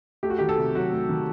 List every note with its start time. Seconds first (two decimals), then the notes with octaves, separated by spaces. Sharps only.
0.23 A3 G4
0.30 F#4
0.39 D#3 G4
0.49 A4
0.58 C3
0.75 F#3 F#4
0.92 A3
1.09 D#3